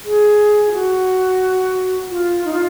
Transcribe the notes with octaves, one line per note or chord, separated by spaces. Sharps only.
G#4
F4
F#4
F4
D#4
F4